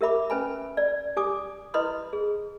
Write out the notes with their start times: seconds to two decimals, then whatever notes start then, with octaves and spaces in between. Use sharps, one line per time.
0.01 G4 A#4 E5 B5 D6
0.30 C#4 B4 G#5 B5
0.77 D5
1.17 G4 G#5 D6 D#6
1.74 E4 B4 D#5 B5 C6 D#6
2.13 G#4